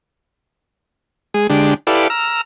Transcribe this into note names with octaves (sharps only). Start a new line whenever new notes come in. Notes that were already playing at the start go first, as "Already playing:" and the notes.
G#3 G#4
D3 G#3 D4 G4
E4 G4 A4 B4 D5 F5
A#5 E6 F6